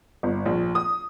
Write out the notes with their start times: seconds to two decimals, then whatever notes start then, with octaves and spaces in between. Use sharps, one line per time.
0.23 G1
0.46 A#1
0.75 D#6